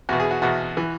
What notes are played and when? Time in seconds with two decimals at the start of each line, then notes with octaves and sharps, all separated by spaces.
0.09 E2 F#4
0.13 B2
0.20 G#4
0.31 F#4
0.42 E2 B2 F#4
0.77 E3